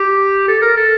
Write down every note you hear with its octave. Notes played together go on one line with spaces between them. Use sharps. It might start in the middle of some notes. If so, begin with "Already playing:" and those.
Already playing: G4
A4
A#4
A4